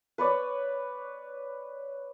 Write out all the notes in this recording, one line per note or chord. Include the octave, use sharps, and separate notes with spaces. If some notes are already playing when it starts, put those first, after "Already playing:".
B4 C#5 D5